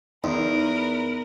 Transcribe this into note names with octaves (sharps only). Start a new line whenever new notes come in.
E2 D#4 A#4 B4